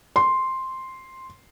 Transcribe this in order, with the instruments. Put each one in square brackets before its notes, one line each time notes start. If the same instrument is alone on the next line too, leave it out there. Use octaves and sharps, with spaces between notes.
[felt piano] C6